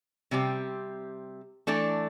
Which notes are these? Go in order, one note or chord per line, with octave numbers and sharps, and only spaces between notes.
C3 G3 C4 G4
E3 A3 D4 A4